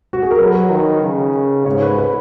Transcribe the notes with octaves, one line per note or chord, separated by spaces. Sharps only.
F#4
G#4
A#4
F#3 B4
D#3
C#3
G#2 C#5
B4
B4